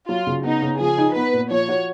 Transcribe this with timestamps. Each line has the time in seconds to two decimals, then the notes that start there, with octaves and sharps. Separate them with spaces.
0.09 F#3 F4
0.27 C#3
0.44 B3 D#4
0.62 C#3
0.80 F3 G#4
0.98 D#4
1.16 B3 B4
1.33 A#2
1.51 F3 C#5
1.69 F#4